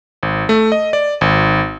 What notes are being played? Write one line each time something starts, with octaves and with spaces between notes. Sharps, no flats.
G#1
A3
D#5
D5
G#1